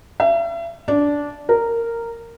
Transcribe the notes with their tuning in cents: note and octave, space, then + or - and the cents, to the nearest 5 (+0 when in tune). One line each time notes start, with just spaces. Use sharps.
E5 +40
D4 -15
A#4 -10